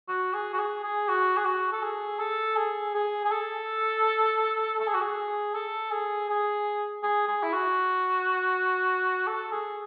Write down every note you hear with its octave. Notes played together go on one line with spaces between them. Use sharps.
F#4
G#4
F#4
G#4
G#4
F#4
G#4
F#4
A4
G#4
A4
G#4
G#4
G#4
A4
A4
G#4
F#4
G#4
A4
G#4
G#4
G#4
G#4
E4
F#4
A4
G#4